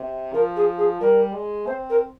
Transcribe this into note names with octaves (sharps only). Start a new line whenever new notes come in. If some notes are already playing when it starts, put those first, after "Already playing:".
Already playing: C3
F3 A#4
G#4
G#4
G3 A#4
G#3
C4 C5
A#4